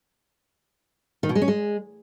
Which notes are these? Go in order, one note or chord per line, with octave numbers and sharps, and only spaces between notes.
D#3
B2
G#3
C#4
G#3